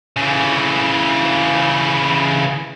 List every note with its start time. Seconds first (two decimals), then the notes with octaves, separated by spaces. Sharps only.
0.17 C#3 E3